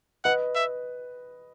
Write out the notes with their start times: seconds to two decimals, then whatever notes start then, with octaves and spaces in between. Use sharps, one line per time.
0.25 B4 D#5 F#5
0.55 E5